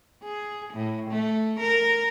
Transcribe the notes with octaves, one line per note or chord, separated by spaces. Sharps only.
G#4
A2
A3
A#4